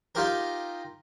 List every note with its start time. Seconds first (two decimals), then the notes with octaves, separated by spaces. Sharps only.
0.15 D#4 F4 G4 A#4